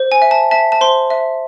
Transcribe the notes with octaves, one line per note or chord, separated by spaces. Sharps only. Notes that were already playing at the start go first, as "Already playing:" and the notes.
Already playing: C5
G#5
E5
A5
E5 A5
A5
C5 C6
E5